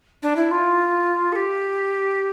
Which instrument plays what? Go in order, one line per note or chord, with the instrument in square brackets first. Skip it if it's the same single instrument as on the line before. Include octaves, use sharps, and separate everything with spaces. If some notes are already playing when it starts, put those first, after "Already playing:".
[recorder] D4
E4
F4
A4
G4